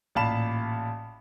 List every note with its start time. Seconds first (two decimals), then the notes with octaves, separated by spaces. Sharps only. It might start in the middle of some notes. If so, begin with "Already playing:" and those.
0.15 A1 A#2 F5 A5 B5 E7